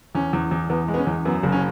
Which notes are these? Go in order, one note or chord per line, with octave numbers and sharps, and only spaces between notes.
E2 C#4
E2
E2
E2 B3
G#3
B3
C#4
E2
F#2 B3
F#1
C#4